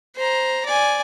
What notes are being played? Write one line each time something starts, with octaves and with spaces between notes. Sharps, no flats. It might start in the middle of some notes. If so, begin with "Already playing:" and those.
C5 A#5
D5 G#5